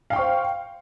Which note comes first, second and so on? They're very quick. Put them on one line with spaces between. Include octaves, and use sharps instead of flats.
F5 G5 C#6 C5